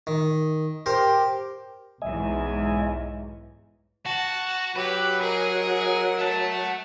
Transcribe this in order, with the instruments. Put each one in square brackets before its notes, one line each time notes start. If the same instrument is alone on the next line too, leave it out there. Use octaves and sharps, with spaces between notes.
[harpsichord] D#3
[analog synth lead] G4 [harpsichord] A#4 C5
[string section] B1 E2 G#2 [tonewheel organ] D#5 E5 G#5
[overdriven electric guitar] F#4 [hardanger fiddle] A5
[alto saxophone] F#3 [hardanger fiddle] G4 [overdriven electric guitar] B4
[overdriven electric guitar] G#4 [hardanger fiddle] A#4 D#5
[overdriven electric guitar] E5 A5
[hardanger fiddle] F#5